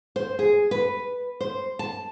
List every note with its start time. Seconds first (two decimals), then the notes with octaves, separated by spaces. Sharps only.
0.16 C5
0.39 G#4
0.71 B4
1.40 C5
1.79 A5